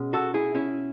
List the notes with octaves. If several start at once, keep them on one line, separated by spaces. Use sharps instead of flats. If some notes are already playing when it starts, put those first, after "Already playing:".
Already playing: B2 G#3 C#4
F#4 A4
E4 G#4
C#4 E4